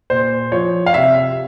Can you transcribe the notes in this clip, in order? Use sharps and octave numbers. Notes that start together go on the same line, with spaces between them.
A#2 C5
F3 C#5
F5
C3 E5